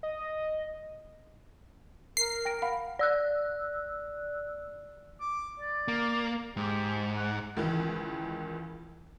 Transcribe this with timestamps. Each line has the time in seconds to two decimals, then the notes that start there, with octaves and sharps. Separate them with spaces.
0.03 D#5
2.17 A#4 C7
2.45 G5 A#6 D7
2.62 F5 F#5 B5
2.99 D5 E6 F#6
5.21 D6
5.60 D5
5.88 A#3
6.57 G#2 G4
7.17 F#5
7.57 C#2 D#3 E3